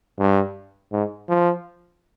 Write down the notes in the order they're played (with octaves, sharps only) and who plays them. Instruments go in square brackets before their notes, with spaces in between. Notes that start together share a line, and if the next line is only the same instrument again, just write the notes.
[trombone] G2
G#2
F3